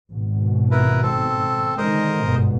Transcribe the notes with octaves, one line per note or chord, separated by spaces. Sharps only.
G#1 B2
E4 A#4 B4
C4 A4
D3 D#3 G#3 A#4 C5 D#5
G1 G#2 B2